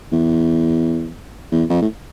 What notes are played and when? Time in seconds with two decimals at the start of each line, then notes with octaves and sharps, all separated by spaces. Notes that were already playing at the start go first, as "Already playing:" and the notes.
0.12 E2
1.52 E2
1.70 F2
1.82 A2